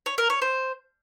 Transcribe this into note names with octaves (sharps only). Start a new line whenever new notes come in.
C#5
A#4
C#5
C5